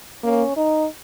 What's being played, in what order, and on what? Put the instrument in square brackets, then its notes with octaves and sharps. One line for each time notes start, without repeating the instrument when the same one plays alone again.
[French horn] A#3 [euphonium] C#4
[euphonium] D#4